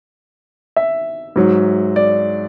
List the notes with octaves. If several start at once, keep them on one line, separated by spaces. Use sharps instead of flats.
E5
G#2 F#3
D5